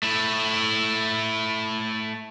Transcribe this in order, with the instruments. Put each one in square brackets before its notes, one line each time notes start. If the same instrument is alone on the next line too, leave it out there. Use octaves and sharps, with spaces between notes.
[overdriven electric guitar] A3 E4